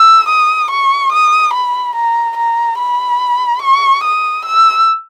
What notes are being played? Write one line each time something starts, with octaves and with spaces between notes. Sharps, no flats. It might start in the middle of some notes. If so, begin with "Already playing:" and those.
Already playing: E6
D#6
C#6
D#6
B5
A#5
A#5
B5
C#6
D#6
E6